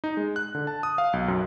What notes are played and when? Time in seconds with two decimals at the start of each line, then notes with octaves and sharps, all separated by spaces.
0.04 D#4
0.17 G#3
0.36 F#6
0.55 D3
0.67 A5
0.83 D#6
0.98 F5
1.13 B1
1.28 F#2